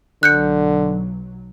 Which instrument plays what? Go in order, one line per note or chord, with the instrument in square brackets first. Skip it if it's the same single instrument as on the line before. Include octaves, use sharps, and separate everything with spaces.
[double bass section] B1 F#3 [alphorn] D3 [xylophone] F#6 G6 C#7